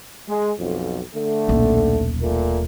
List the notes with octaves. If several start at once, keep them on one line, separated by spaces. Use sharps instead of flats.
G#3
B1 F2
D3 A3
D#1 B1
A#2 A3 A#4